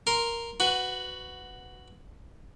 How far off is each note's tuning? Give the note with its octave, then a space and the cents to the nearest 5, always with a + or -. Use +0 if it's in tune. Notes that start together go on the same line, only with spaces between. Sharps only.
A#4 +0 C6 +0
F#4 +0 B4 +15